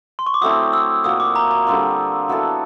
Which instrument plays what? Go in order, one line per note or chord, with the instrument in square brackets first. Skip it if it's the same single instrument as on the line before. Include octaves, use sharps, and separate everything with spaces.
[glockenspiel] C6
C#6
D6
[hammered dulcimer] F#3 A3 C4 E4 [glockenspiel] D#6
[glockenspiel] E6
[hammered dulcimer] A#2 F#3 A#3 [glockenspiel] D#6
[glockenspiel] D6
A#5
A#5
[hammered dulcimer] D3 G3 C4 F4
F#3 B3 E4 A4